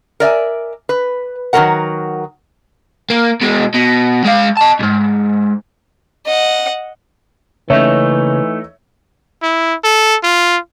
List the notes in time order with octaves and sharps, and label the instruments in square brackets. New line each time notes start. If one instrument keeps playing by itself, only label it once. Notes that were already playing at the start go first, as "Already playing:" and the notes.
[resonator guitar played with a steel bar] A#4 D5 E5 G#5
B4
D#3 F#3 C4 F#4 A#4 F#5
[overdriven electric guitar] A#3
B2 G#3
B2
G#3 F5
D#5 A5
B1 G#2
[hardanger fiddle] D#5 F#5
[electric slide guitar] C#3 A#3 C#4 [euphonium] E3 [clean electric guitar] A3 D#4 [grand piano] C#5 E5
[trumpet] E4
A4
F4